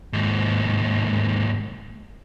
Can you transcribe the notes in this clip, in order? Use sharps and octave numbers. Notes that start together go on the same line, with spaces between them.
D#2 G#2